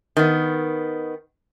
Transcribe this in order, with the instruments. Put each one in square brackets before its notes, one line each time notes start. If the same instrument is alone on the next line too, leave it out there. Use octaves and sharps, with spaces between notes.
[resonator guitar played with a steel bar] D#3 B3